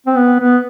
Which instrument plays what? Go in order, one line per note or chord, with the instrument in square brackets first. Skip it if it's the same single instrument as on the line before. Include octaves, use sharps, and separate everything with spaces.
[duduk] C4
B3
B3